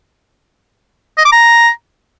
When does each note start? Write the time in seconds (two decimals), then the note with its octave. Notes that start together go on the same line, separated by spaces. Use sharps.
1.18 D#5
1.25 D6
1.32 A#5